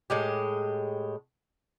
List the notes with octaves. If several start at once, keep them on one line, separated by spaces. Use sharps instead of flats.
A2 G#3 G4